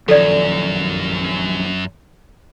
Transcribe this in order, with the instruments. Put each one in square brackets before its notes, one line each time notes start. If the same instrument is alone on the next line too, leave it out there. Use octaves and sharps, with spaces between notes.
[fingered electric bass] A#1 D#3 F3 [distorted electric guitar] F#2 [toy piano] A4 D5